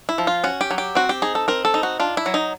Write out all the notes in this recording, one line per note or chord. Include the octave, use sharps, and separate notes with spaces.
E4
F3
F4
C#4 F#4
G4
F#3
G4
C4 F#4
G4
D#4 G#4
A4
C4 A#4
A4
D#4
F#4
D4 F4
E4
F#3
D#4